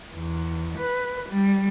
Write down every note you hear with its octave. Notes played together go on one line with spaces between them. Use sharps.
E2
B4
G3